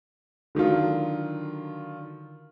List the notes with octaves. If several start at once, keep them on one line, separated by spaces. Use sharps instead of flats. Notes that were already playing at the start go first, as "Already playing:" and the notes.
D3 D#3 F#3 F4